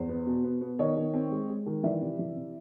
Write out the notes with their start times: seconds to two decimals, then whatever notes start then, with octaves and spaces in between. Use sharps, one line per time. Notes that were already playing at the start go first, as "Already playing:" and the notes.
Already playing: E2 C5
0.09 B3
0.26 B2
0.44 B3
0.61 B3
0.79 D#3 C#5 D#5
0.97 D#3
1.14 C4
1.31 G#3
1.49 G#3
1.66 D#3
1.83 E3 D5 E5
2.01 C3
2.19 E3
2.36 C3